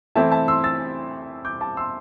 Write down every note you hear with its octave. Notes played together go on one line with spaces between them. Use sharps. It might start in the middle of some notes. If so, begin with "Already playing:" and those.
E3 A3 C4 E4 E5 A5
E5 A5
C6 E6
E6 A6
D6 G6
A5 D6
C6 E6